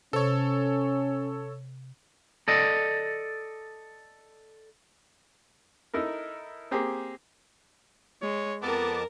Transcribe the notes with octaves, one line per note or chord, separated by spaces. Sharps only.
C3 C#4 A4 C#5
A4 D5 D#5
D#4 E4 A4 A#4
A#3 C4 G4 G#4
G#3 C#5
F2 B3 A#4 A5 D6